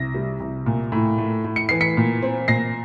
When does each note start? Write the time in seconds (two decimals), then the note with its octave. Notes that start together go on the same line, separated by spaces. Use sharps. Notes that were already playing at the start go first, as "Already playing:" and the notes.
Already playing: C2 A#6
0.15 G3
0.40 C2
0.66 A#2
0.92 A2
1.18 A3
1.44 A2
1.56 C#7
1.69 E3 C7
1.81 B6 C#7
1.97 A#2
2.23 C4
2.48 A#2 A#6 C7